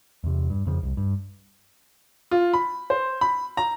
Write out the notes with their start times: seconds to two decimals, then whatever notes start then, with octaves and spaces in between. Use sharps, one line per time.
0.24 E2 C3
0.50 G2
0.67 F2 C#3 F3
0.83 C2
0.97 G2
2.31 F4
2.54 B5
2.90 C5
3.21 B5
3.57 A#5